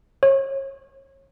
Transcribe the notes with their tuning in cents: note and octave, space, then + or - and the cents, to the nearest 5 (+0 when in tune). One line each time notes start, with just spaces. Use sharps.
C#5 -35